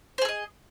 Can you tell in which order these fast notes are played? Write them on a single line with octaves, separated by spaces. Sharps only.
C5 G#4 A4 D#5